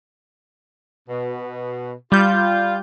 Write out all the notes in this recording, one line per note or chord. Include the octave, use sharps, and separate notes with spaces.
B2
G3 F4 G6